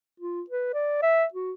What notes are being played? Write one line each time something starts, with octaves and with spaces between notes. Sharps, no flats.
F4
B4
D5
E5
F#4